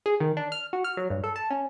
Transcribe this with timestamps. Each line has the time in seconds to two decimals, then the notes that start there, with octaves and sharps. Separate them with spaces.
0.06 G#4
0.20 D#3
0.37 D4
0.52 F6
0.73 F#4
0.84 F6
0.97 F#3
1.10 G2
1.24 A4
1.36 A5
1.50 C#4